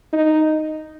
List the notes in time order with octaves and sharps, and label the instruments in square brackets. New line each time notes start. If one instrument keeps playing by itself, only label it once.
[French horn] D#4